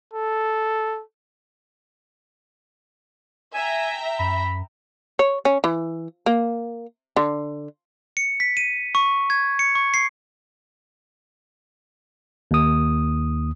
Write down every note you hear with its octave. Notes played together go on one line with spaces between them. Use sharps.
A4
E5 G5 G#5 A#5
F#2 B5
C#5
C#4
E3
A#3
D3
C#7
B6
D#7
C#6
G#6
C#7
C#6
C7
D#2 D#6